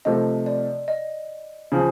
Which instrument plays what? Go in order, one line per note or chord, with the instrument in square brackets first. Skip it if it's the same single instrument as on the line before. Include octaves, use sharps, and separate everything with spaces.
[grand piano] C3 F3 A3 [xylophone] D#5
[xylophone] D5
D#5
[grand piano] C#3 F3